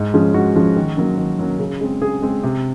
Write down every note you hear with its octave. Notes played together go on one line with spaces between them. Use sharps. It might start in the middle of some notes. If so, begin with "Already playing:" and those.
Already playing: G#2
F3 G#3 C#4
G#2 F#4
F3 G#3 C#4
D#3
F#3 A#3 C#4
D#3
F#3 A#3 C#4
C#3
G#3 C4
C#3 G#4
G#3 C4
C3